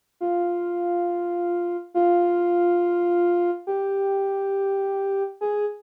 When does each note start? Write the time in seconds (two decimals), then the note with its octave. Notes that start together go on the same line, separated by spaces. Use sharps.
0.21 F4
1.94 F4
3.67 G4
5.41 G#4